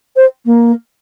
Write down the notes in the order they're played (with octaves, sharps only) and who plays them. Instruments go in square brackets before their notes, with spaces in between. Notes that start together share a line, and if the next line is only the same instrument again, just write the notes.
[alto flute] C5
A#3